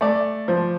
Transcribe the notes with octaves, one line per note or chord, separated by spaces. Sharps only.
A3 D5
F3